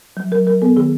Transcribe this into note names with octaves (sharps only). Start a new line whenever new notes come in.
F#3
F#3 A#4
F#3 A#4
B3 A4
D#3 G#4